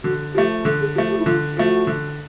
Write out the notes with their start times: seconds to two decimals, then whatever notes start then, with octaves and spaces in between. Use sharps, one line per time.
0.04 D3 F#4
0.34 F3 A3 G4
0.65 D3 A4
0.81 G#4
0.95 F3 A3 G4
1.06 F#4
1.10 G4
1.19 E4
1.26 D3 F4
1.57 F3 A3 F#4
1.87 D3